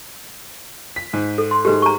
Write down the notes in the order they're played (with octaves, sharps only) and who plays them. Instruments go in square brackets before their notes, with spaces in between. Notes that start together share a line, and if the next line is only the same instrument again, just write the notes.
[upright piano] B6
G#2
[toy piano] A4
C6
[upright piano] G#2 G#3 A3 [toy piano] G4 B4
[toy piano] A#5 C#6